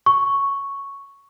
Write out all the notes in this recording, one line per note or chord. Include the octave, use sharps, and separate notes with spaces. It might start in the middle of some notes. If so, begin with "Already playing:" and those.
C#6